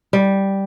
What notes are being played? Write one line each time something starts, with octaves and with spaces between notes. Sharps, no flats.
G3